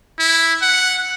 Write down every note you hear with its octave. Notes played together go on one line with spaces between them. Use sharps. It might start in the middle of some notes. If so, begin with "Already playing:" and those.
E4
F#5